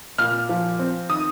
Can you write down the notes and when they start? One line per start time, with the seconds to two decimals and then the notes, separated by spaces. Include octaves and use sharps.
0.18 A#2 F6
0.49 F3
0.79 C4
1.10 D#3 D#6